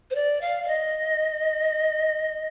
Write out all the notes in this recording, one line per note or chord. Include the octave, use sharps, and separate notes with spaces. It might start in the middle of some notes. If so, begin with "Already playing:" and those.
C5
D5
F5
F5
D#5